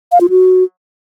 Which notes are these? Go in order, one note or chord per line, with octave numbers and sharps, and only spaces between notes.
F5
F4
F#4